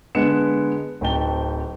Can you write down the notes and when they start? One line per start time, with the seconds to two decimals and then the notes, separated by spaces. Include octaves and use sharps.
0.15 D3 G#3 B3 B4 C#7 E7
1.01 D1 C4 D#4 G5 A5 G7